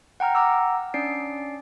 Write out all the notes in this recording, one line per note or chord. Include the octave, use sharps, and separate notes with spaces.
F#5 G5 A#5 F6
F#5 A#5 D6 E6
C#4 D4 D5 C7 D7